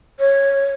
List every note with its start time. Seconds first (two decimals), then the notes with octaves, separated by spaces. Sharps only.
0.19 C#5